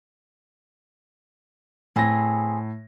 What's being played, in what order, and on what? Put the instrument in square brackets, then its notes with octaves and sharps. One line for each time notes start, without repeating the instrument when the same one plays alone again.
[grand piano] A2 A#6 [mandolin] B3 C4 G#4